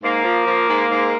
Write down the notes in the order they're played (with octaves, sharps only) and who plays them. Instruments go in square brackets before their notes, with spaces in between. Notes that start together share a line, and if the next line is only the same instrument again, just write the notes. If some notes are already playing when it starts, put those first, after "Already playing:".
[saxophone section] G#2 A#3
F3
F3
G#2
G#2